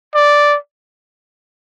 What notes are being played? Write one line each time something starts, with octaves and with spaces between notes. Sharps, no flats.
D5